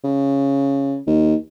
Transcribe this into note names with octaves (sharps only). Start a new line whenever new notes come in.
C#3
D#2